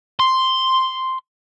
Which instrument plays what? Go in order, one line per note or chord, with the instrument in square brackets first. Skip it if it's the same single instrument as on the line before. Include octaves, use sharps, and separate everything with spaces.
[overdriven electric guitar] C6